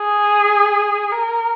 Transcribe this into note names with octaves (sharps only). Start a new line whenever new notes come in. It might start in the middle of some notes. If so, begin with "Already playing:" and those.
Already playing: G#4
A#4